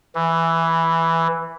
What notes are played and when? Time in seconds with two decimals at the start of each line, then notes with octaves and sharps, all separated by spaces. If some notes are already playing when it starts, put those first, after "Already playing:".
0.15 E3